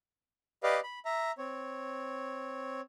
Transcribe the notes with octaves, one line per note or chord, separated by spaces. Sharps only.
G4 B4 D5 D#5 F5
B5
E5 A#5
C4 C#5